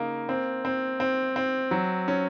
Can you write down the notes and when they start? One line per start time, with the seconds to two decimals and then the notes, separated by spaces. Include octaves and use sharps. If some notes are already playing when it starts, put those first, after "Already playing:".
Already playing: C#3 A#3 D#4
0.29 C4
0.65 C4
1.00 C4
1.36 C4
1.71 F#3
2.08 C#4